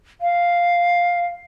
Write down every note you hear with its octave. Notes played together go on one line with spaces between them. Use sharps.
F5